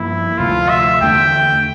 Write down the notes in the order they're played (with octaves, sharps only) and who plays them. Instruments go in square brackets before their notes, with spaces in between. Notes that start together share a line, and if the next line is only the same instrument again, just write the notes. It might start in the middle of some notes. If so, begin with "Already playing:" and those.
Already playing: [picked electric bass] G2 F3 A#3 [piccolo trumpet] E4
[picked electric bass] D2 C3 F3 A3 [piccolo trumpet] F4
[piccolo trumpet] E5
[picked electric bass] E2 D3 A3 [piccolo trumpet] G5